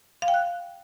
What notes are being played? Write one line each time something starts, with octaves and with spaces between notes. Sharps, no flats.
F5
G5
F#6